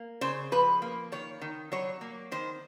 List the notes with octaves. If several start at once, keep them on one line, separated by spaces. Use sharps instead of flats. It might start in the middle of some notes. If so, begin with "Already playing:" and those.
Already playing: A#3
C#3 C5
F3 B4
A#3
D#3 C#5
D#3
F#3 C#5
A#3
D#3 C5